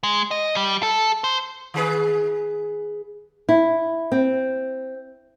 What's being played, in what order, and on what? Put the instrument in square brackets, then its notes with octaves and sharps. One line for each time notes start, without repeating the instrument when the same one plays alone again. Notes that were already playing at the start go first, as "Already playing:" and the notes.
[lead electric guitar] G#3
D#5
G3
A4
C5
[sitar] D#3 G#4 B4
[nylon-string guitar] E4
C4